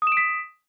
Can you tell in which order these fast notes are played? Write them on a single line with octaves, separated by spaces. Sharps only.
D#6 E7 D7 B6